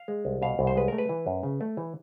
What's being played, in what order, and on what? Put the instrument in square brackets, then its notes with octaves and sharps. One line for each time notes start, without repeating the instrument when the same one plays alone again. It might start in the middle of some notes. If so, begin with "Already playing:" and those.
Already playing: [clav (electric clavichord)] F5
G#3
C2
B2 F5
C2
C5
G#3 B4
A3 A#4
B4
E3
F#2
C#3
A3
E3